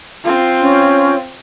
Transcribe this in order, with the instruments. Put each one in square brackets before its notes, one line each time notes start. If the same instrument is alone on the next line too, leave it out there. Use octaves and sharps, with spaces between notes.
[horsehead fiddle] C4 F4
[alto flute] C#4